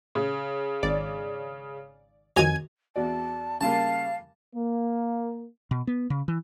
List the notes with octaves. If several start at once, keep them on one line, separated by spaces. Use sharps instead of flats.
C#3
G#1 D5
F2 D#3 F#3 G#5 G#6
E2 F#4 D5 A5
C#3 G3 A#3 F5 A5
A#3
B2
B3
C#3
E3